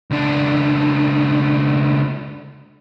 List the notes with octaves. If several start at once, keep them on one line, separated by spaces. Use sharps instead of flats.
C#2 D4